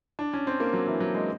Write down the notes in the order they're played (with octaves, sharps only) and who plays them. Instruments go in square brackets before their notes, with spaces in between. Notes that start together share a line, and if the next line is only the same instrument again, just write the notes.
[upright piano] D4
C#4
C4
A#3
F#3
E3
F#3
G#3